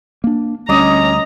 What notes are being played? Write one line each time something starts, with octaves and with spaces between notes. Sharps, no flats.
A#3 D4
D2 G3 C#4 D#5 A#5 D6 D#6